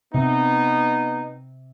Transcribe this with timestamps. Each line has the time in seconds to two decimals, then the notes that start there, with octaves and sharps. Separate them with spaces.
0.14 C3 B3 D#4